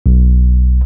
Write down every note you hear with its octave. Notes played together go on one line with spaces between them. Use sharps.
B1